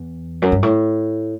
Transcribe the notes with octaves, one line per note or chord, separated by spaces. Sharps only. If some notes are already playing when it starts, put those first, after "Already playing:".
Already playing: E2
F#2
G2
A2